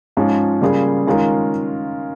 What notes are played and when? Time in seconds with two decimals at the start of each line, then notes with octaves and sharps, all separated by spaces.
0.17 G#2 F3 G#3 C#4 F4
0.61 C#3 G3 A#3 F4 G#4
1.06 D#3 G#3 C#4 F4 A#4